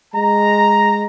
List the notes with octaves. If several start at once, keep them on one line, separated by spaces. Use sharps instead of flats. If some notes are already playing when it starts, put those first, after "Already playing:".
G#3 A#5